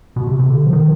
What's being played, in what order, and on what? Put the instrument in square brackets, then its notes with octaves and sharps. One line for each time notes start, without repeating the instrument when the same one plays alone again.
[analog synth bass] B2
C3
C3
D3
F3
D#3